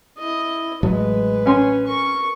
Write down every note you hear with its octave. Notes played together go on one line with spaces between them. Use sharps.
E4 D#5
A1 F#3 G#3 B4
C#4 C#5 G#5 C6
A#4 C#6